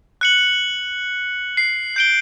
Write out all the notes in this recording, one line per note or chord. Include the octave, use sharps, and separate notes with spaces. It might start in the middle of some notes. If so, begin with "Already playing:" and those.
F#6 C#7 F#7
C7
G6 D7 G7